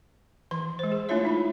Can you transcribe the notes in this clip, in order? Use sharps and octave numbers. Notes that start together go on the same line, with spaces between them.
E3 C6
G#3 C5
G#4
A3 D4 E4 F4 C#5 E5
D#4 E4